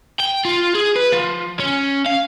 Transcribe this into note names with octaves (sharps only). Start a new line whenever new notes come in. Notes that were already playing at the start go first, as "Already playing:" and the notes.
G5
F4
G#4
B4
F3
C#4
F5